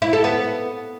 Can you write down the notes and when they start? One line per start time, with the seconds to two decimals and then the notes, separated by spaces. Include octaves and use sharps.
0.02 E4
0.13 A4
0.24 B3